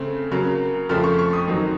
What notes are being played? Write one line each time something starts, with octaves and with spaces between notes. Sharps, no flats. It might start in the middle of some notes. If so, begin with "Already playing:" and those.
Already playing: C#3 A3 C4
C#3 F#3 A#3
F2 C#3 F3 A3 C4 F6
C#6
C#6
D#6
F#2 D#3 F#3 C4